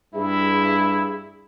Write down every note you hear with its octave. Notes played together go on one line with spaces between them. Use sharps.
G2 E4 G#4